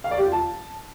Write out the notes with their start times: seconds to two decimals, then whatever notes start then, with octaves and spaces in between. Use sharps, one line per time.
0.04 F5
0.11 D5
0.18 G4
0.25 F4
0.32 A5